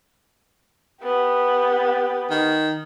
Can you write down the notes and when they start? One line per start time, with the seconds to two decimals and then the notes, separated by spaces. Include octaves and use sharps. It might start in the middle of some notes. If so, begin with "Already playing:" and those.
1.03 B3 G4
2.30 D#3